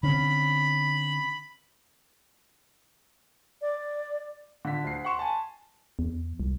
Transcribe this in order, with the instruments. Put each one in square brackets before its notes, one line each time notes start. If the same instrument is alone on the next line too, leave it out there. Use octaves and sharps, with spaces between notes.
[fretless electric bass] D3 C4 C#4 [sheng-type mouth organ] B5
[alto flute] D5
[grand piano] D3 F4 B6
D2 C7
F#5 C6 C#6 E7
G#5 A5
[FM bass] E2
C2